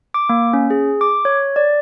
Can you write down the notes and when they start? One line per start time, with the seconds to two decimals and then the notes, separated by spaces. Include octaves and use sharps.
0.14 D6
0.29 A#3
0.53 C#4
0.70 G#4
1.01 D6
1.25 C#5
1.56 D5